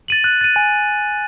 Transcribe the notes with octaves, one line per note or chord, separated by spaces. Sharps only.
A6 D#7 F#7
F#6
A6 D#7
G#5